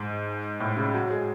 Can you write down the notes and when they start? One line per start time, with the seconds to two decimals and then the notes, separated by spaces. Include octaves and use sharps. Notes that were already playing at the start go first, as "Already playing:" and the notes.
Already playing: G#2
0.60 A2
0.77 C#3
0.94 F#3
1.10 G#3